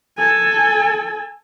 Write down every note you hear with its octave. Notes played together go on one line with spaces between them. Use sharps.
A4 G#5